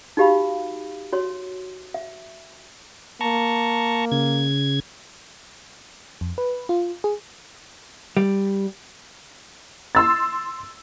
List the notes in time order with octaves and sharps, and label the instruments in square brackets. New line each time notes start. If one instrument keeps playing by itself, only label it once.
[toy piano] D#4 F#4 G4 F5 B5
F#4 C#5 C6
E5
[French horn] A#3 [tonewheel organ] A5 A#5 C#6
[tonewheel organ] C#3 G#6
[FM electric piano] F2
B4
F4
G#4
[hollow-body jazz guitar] G3
[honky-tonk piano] C6 E6 A6